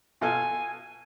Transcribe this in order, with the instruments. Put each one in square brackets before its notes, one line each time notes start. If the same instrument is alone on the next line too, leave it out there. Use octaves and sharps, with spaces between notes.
[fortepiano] B2 F4 A4 [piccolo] G#5